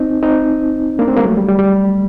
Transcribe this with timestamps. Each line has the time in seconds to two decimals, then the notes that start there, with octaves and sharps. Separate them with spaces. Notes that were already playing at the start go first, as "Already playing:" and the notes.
Already playing: C4 D#4
0.22 C4 D#4
0.99 A#3 D4
1.08 A3 C4
1.17 G3 A#3
1.25 F#3 A3
1.37 G3
1.48 G3
1.59 G3